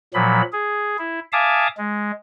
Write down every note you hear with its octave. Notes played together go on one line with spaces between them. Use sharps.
A#2 F3 F#3 B5
G#4
E4
E5 F5 G#5 A5 D6 D#6
G#3